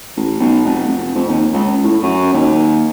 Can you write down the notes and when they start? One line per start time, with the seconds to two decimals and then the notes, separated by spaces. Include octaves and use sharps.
0.17 A1
0.40 B1
0.65 F1
0.87 F1
1.15 F2
1.29 D#2
1.53 C#2
1.84 A2
2.02 F#2
2.33 D#2